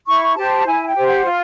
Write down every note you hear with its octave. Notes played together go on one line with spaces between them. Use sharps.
E4 C#6
G4 C5 A5
E4 G#5
G5
G4 C5
F#5
F4